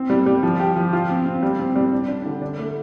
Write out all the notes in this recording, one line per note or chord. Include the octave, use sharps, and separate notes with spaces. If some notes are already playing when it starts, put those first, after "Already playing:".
Already playing: C4
G3
G3
F3
G4
F3
F4
C4
C4
G3
C4
G3
D4
D4
D3
D4
A3